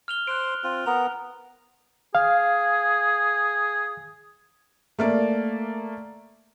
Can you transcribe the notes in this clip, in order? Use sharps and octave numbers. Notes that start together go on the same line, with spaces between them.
F6 F7 G7
C5 F#6 D7
C4 F4
B3 A#4 F7
G#4 F5
A3 A#3 D5